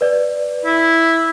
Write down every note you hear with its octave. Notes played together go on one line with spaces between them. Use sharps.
B4 D5
E4